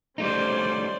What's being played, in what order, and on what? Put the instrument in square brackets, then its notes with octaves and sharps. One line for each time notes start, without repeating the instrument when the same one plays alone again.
[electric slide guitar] G3 A3 D#4 [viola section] C#4 C5 D5